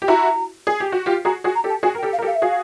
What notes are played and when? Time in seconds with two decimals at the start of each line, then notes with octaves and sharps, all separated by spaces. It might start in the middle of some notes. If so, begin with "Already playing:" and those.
0.02 G4
0.08 E4 F#4 A#5
0.67 G#4
0.80 G4
0.92 F#4
1.06 F4 G4
1.25 F#4 G#4 A#5
1.44 F#4 G#4
1.55 A#5
1.64 G4 A4
1.69 A5
1.83 F#4 G#4 G#5
1.95 A#4
1.98 G5
2.03 G4 A4
2.12 F5
2.19 A#4
2.22 G4 A4
2.27 F5
2.35 E5
2.42 F#4 G#4 F5